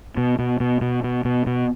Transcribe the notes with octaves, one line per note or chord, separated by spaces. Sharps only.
B2
B2
B2
B2
B2
B2
B2